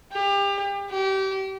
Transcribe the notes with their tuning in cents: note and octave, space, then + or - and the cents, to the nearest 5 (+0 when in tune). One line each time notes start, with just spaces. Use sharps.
G4 +30
G4 -30